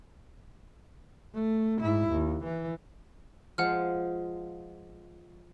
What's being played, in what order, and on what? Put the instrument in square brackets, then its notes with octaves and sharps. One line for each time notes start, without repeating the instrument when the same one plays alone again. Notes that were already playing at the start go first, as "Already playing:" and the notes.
[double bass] A3
G#2 E4
D#2
E3
[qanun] F3 G#3 [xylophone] F#5 F6